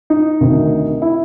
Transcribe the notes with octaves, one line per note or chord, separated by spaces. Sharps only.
D#4
D2 C3 D#3
E4